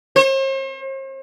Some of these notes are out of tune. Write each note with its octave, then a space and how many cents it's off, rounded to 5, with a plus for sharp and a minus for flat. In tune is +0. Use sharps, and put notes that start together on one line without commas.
C5 +45